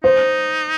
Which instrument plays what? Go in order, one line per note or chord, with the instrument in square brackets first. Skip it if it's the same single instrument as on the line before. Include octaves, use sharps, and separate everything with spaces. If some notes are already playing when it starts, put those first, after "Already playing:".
[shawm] D#4 [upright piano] C5